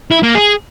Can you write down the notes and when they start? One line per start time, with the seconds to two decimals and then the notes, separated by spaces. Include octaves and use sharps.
0.11 E4
0.23 A#3
0.35 G#4